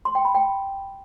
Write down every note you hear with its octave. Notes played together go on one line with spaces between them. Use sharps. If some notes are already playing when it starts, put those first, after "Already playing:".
C6
G5
B5
G5